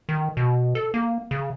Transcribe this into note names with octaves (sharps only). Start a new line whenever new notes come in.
D#3
B2
A4
A#3
C#3